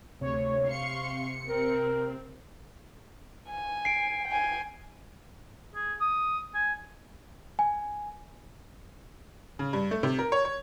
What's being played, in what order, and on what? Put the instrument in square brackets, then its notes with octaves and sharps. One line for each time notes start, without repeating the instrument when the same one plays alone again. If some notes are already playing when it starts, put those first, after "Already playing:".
[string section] D2 [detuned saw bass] C3 [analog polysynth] C#5
[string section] F5 C6 C#6 [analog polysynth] C#7
[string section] C4 [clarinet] A#4
[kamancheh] G#5
[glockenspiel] C7 D7
[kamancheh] G5 G#5
[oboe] G#4
D#6
G#5
[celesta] G#5
[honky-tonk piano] C#3
G2
A3
C3
A#4
C#5
C#5